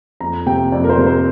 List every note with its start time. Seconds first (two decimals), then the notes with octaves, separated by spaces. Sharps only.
0.20 F2 A#5
0.46 C3 G5
0.72 F2 D5
0.84 A#4
0.89 C5
0.98 C3 A#4
1.06 C5